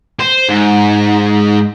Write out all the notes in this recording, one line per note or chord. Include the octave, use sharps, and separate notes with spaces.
C5
G#2